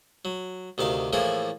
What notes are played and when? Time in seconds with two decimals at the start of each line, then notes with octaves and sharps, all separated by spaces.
0.25 F#3
0.78 D2 C3 D#3 F5
1.13 A2 E3 F3 A#3 G#4